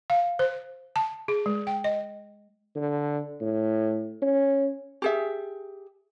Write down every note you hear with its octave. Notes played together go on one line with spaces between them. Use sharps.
F5
C5
A5
G#4
G#3
G5
D#5
D3
A2
C#4
G4 G#4 E5